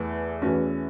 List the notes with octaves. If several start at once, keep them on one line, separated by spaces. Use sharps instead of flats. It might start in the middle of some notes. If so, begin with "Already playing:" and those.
Already playing: E2 E3 A3
E2 E3 A3 C#4 F#4